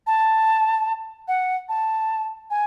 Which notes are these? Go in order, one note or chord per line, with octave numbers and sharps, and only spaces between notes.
A5
F#5
A5
G#5